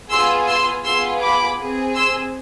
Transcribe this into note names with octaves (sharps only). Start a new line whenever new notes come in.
B3 F4 G#4 C6 E6
C6 E6
B3 F4 G#4 C6 E6
B5 D6
C4 G#4
C6 E6